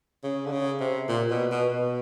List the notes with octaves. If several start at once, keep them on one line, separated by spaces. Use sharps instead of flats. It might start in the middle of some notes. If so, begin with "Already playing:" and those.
C#3
D3
C#3
C3
A#2
B2
B2
B2